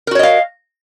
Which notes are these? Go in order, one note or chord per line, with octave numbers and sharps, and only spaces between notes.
F#4 A#4 C#5 D#5 F5